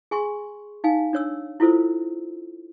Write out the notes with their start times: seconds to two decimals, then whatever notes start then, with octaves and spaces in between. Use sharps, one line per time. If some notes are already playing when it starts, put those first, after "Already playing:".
0.11 G#4 G#5 C6 C#6
0.84 D#4 F5 G#5
1.13 D4 C#5 E6
1.60 E4 F4 A4 C5 E6